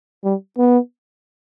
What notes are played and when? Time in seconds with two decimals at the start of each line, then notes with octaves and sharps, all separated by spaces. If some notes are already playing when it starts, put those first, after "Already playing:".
0.24 G3
0.58 B3